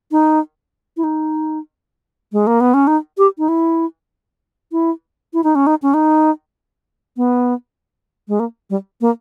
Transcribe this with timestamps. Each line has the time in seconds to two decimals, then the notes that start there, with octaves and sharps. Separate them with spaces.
0.12 D#4
0.97 E4
1.04 D#4
2.33 G#3
2.47 A#3
2.61 B3
2.74 C#4
2.87 D#4
3.18 G4
3.38 D#4
3.48 E4
4.72 E4
5.34 E4
5.44 D#4
5.55 C#4
5.67 D#4
5.82 C#4
5.94 D#4
7.17 B3
8.28 G#3
8.40 A#3
8.70 G3
9.01 A#3